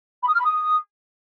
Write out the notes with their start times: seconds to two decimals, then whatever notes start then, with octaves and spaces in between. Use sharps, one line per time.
0.23 B5
0.28 D#6
0.34 F6
0.39 B5
0.45 D#6